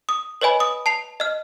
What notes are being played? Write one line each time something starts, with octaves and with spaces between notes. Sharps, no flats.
D#6
B4 C#5 D#5 G#5 B5
D#6
A5 C7 F7
D#5 F6